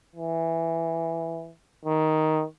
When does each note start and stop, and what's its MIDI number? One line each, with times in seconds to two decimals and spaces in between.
0.15 1.50 52
1.85 2.43 51